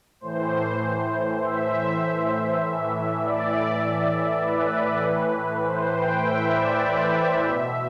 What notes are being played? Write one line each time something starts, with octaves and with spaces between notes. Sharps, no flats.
A2 E3 C5
E5
A2 E3
D5
B4
A2 E3
C5
G5
E5
D5
E5
B2